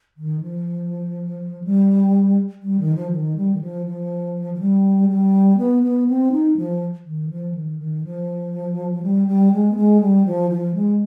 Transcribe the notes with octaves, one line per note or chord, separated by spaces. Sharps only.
D#3
F3
G3
G3
D#3
F3
D#3
G3
D#3
F3
F3
F3
G3
G3
B3
B3
C4
D#4
F3
D#3
F3
D#3
D#3
F3
G3
G3
G#3
B3
G#3
G3
F3
F3
G#3